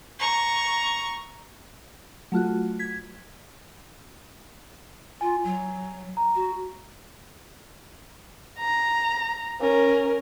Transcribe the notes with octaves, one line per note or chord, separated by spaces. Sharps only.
A#5 C#6
F#3 A3 F4 F#4
G#6 B6
F4 G#5
F#3
A#5
F#4
A#5
C#4 A#4